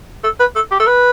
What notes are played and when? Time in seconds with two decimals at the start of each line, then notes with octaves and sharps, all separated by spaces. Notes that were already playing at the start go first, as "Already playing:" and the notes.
0.24 A4
0.40 B4
0.55 A4
0.71 G4
0.80 A4
0.87 B4